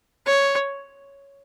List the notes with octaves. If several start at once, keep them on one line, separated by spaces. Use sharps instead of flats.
C#5